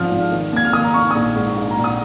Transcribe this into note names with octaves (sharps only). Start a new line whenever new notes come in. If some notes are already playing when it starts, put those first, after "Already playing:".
Already playing: G#1 G#2 F3 F6
G#1
D#3
D#2 G#6
F6
D#3 D#6
A#5
D#2 C#6
D#6
A#1 C#6
G#2
G#2
A#5
A#1
D#6